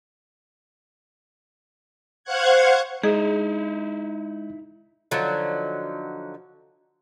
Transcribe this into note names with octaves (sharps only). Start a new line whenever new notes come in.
C5 F5 F#5 C#6 F#6 G#6
G#3 D#4 E4 G#4 D#5 E5
D3 F3 F#3 D#4